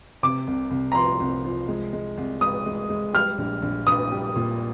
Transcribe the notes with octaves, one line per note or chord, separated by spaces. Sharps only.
C3 D6
C2
C2
A#5
F3 C6
C2
F3
G#3
G#3
C2
G#3 D#6
G#3
G#3
G3 F6
A#1
A#1
A#1 D#6
G3
A#2